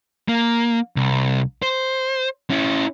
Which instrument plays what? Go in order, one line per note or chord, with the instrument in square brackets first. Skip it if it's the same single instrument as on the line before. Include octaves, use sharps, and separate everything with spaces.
[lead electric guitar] A#3
C2
C5
C#4 E4